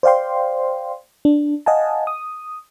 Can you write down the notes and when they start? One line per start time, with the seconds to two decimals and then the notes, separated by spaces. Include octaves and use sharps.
0.03 C5 D5 F5 G5 C6
1.25 D4
1.66 D#5 F5 F#5 G#5 A5
2.07 D#6